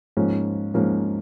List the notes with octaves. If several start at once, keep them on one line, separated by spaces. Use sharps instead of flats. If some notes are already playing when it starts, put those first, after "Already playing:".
G#2 F3 A#3 C#4
G#2 F3 A#3 C#4